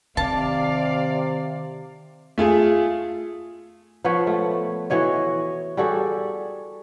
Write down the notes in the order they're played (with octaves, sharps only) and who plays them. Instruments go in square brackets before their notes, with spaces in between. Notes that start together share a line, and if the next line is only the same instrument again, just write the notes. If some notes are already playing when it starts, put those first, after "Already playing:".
[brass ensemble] C3 [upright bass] D#3 [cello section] D5 F5 [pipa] A5
[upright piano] A3 F4 G#4
[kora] F3 B3 B4 C#5
A3
E3 F#4 C#5 D#5
G3 F#4 G#4 A4